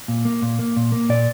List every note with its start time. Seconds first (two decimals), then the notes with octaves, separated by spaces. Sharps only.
0.08 A#2
0.25 A#3
0.42 A#2
0.59 A#3
0.76 A#2
0.92 A#3
1.09 A#2 D5